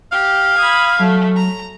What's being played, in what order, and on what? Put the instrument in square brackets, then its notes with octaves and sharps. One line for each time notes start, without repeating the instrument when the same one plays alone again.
[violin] G4 [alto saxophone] F5
[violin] B5 G#6 [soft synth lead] D#6
[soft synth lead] F#3 [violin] A3
[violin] A#5